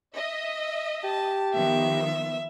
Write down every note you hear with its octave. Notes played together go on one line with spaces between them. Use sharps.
D#5 E5
G4 A5
D#3 F3 B3 E5